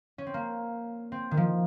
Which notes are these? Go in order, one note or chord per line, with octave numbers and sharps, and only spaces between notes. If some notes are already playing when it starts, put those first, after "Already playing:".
C#4
C4
A#3
C4
D#3
F3